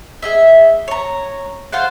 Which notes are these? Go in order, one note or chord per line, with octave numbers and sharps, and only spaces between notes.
G#4 D#5 E5
C#5 A#5
F4 C5 F5 F#5